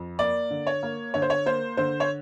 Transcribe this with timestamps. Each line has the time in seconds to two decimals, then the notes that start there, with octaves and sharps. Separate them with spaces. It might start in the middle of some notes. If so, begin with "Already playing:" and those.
Already playing: F2
0.19 A#3 D5
0.50 D3
0.67 C#5
0.83 A#3
1.14 D3 C#5
1.22 C5
1.30 C#5
1.46 A#3 C5
1.77 D3 C5
2.00 C#5